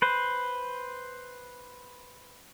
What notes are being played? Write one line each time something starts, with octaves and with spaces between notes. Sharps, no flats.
B4 C5